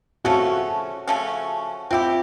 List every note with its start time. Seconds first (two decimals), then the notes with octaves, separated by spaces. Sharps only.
0.25 C#3 F3 A3 C#4 F#4
1.08 C#3 F3 A3 C#4
1.91 C4 E4 F4 G4